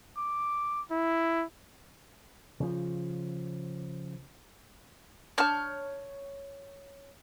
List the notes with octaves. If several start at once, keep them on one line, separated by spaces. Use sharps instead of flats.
D6
E4
C#3 F3
D4 C#5 A5 F6 G6